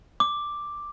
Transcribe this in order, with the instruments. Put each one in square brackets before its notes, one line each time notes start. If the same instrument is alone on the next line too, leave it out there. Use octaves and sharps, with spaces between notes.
[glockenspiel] D6